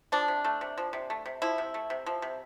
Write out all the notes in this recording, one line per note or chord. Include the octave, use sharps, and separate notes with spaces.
F3 D4
C3
A3
C3
F3
C3
A3
C3
F3 E4
C3
A3
C3
F3
C3